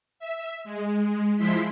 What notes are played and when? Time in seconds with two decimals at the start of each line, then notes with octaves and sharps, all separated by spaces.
0.20 E5
0.64 G#3
1.37 F3 G#3 E4 C6 B6